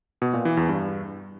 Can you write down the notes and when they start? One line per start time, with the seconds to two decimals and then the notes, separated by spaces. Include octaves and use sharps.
0.22 B2
0.33 A#2
0.45 E3
0.57 E2
0.69 G2